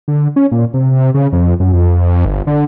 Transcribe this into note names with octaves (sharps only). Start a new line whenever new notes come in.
D3
C#4
A#2
C3
C#3
F2
F#2
F2
G1
D3